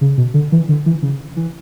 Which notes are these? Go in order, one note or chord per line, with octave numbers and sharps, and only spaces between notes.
C#3
B2
D3
E3
D3
E3
C#3
E3